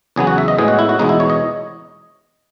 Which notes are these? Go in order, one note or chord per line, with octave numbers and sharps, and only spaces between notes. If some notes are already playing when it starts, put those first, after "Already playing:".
E2 C#3 F#3 B3 G#4
F#4
E5
D#5
A2 G#3 B3 G#4
F#4
E4
F#4
E2 B2 G#3 B3 D#4
E4
C#5
D#5